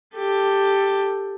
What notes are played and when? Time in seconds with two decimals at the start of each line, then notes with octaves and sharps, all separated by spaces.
0.16 G4 A4